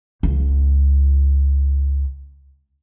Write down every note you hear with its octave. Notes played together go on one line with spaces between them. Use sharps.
C#2 F4